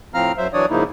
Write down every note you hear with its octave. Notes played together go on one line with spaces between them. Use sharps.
A2 F3 C4 F5 A#5 F6
F#2 F#3 C5 E5
E3 F#3 D4 C#5 D5 D#6
G#2 C#3 F3 A#3 D#4 E4